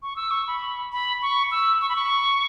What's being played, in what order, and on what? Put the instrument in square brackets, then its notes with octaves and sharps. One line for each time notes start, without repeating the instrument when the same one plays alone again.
[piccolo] C#6
E6
C#6
B5
B5
C#6
E6
C#6
B5
C#6